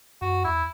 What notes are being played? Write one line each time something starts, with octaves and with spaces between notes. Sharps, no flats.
F#2 F#4
E2 E4